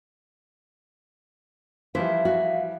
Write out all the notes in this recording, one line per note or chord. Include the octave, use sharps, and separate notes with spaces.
E3 F3 G3 E4 C5 F5
F#4